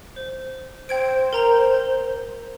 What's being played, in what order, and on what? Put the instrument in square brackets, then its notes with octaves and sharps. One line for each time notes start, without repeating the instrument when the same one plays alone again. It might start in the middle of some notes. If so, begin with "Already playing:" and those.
[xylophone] C5
[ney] C5 [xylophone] G5 G#6 D7
[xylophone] A#4 A#5 F7